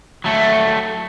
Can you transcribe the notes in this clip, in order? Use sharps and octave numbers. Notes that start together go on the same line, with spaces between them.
F#3 A3